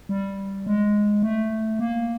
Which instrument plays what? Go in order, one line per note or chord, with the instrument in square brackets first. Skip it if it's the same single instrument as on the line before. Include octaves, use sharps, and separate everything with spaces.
[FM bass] G3
G#3
A3
A#3